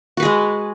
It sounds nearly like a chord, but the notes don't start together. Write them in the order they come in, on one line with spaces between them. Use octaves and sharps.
F#4 B4 G#4 G#3